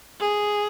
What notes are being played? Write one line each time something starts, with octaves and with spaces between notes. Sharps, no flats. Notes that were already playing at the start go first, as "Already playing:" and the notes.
G#4